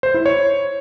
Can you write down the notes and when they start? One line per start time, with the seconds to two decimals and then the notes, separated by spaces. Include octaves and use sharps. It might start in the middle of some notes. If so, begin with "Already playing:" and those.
0.03 C5
0.14 E4
0.26 C#5